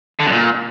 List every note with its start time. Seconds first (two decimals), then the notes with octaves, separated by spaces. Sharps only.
0.20 D3
0.26 F#2
0.32 A#2